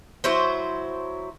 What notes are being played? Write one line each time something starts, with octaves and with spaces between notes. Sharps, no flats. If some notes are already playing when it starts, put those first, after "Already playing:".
F#3 E4 C5